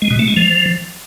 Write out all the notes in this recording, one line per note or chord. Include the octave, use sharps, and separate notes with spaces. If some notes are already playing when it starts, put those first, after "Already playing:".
G#3
B2
A3
G#3
F3